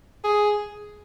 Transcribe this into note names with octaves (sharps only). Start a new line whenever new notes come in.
G#4